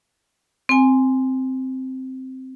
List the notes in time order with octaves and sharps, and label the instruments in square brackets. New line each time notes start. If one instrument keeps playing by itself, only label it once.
[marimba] C4 G#5